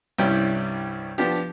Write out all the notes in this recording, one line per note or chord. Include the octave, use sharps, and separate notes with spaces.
C2 G2 G3 C#4 E4 G5
F3 B3 D4 G4